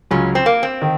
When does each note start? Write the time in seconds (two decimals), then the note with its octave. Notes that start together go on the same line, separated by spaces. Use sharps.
0.11 C#2 C#3 F#3 C#4
0.35 C4
0.46 A#3
0.63 C4
0.82 D#3